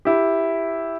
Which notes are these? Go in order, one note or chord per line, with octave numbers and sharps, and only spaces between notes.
E4 G4